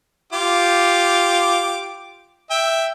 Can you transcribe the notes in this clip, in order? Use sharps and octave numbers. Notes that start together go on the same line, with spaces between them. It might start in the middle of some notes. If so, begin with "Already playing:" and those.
F4 G4 D6
E5 G5